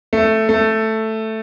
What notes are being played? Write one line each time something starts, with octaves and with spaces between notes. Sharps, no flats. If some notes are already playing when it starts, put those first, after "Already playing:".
A3
A3